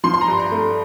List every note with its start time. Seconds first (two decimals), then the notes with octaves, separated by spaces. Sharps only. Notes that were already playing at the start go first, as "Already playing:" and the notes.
0.04 F3 C6
0.14 C6
0.21 A#5
0.28 G2
0.39 A#5
0.51 A3